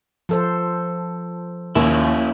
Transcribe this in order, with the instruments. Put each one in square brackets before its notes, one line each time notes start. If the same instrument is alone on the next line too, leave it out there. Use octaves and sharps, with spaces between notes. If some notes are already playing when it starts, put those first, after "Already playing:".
[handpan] F3 A4 C5
[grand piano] D#2 [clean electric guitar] A#3 C#4 E4